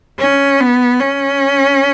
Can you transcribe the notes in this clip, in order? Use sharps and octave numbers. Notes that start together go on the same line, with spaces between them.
C#4
B3
C#4